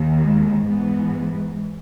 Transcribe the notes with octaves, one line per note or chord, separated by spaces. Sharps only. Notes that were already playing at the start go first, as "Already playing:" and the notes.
Already playing: D#2 D#3
G#3
G#2 E3 B3